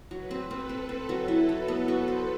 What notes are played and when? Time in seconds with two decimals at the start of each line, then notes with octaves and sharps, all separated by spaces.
0.11 F#3 B4
0.31 C4
0.51 C4 A4
0.69 C4
0.89 C4
1.09 F#3
1.28 E4
1.49 F#3
1.68 B3
1.88 F#4
2.08 C5